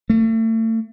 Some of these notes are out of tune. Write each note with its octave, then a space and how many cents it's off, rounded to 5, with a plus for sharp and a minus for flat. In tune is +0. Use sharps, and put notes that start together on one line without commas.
A3 +35